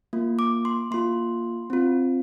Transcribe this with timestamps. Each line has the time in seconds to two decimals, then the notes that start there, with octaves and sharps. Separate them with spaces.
0.13 A#3 F4
0.39 D6
0.65 C6
0.91 A#3 F4 C6
1.70 C4 F4